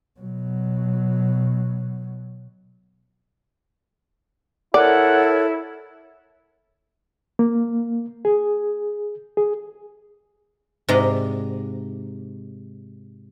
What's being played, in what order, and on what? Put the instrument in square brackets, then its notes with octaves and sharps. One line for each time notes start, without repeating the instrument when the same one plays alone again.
[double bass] B2 F#3
[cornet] E4 [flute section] A4 A#4 C#5 [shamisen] D5 [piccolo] F#5
[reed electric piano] A#3
G#4
G#4
[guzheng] G#2 C3 D5 D#5 A#5